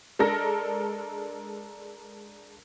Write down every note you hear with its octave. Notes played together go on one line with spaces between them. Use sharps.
G#3 D4 A4 A#4 A#6